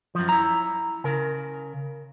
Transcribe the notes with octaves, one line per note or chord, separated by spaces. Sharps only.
F#2 F3
E4 A#5
C#3 A#4